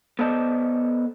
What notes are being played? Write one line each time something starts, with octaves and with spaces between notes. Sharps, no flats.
B3 A4 C5 D5 D#5 A5